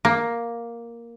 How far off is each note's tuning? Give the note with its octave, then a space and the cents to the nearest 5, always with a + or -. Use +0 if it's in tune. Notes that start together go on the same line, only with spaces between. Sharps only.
A#3 +5